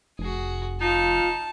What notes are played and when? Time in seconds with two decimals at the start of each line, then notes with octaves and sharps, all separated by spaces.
0.19 F1 F#4 G#4
0.81 D#4 F4 A5